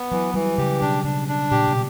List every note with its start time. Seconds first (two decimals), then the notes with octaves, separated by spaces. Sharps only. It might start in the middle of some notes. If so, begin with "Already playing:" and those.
Already playing: B3
0.11 E3 F#3
0.34 E3 G3
0.58 C#3 G4
0.81 B2 D4
1.04 C#3 D4
1.28 D4
1.51 A#2 G4
1.68 B2